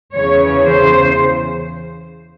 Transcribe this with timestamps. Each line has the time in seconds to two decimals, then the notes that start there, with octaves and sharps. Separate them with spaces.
0.13 E2 C#3 E3 C#5
0.65 C5